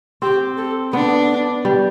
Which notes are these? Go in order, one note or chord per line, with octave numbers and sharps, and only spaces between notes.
C4 G4
A4
B3 D4
G3